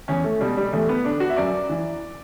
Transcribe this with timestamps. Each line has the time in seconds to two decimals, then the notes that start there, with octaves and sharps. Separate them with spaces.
0.08 E2 C#4
0.24 A3
0.41 B2 G3
0.57 G3
0.73 E2 A3
0.89 B3
1.04 D3 D4
1.20 F#4
1.30 E5
1.36 F#2 D5
1.70 E3